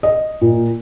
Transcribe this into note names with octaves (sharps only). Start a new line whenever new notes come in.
D#5
A#2